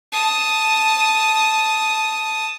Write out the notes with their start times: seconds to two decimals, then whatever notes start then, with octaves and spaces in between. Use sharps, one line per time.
0.12 A5 D#6